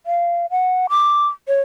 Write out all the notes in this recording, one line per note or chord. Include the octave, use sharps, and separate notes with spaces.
F5
F#5
D6
C#5